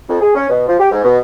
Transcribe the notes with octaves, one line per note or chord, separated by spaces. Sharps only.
F2
G#4
C#4
B2
F3
G4
G#2
B2